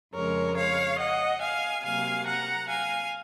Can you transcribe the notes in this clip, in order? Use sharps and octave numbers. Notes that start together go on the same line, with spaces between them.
F2 C#3 G#3 A#4 C#5
C#5 F5
D#5 F#5
F5 G#5
C3 F#3 A#3 F5 G#5
F#5 A#5
F5 G#5